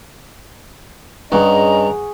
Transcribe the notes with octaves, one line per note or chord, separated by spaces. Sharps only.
G2 C#4 F#4 G#4 D#5 A#5